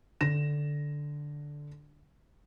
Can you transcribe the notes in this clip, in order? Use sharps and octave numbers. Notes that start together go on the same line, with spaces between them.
D3 A#6 E7